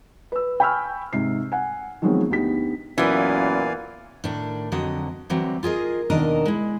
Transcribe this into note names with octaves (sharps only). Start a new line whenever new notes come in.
B4 E6
G5 G#5 B5 C#6 E6 F6
G#2 C3 C7
F#5 G#5
D#3 F3 F#3 G#3 B3 C4
D2 B3 D#4 G4 B6
F#2 A#2 E3 B3 D5 F5 G#5
A2 D#3 D4
F2 D3 F#3 D#5
D3 E3 F#3 G3 C4
F4 G#4 A#4 D#5
D#2 B2 D#3 D4 A#4 D#5
G#3 E4